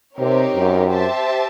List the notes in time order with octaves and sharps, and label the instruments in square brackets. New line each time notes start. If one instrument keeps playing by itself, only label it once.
[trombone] C3 [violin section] C4 D#4 G4 A#4 C#5
[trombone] F#2
[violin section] G4 C5 E5 A5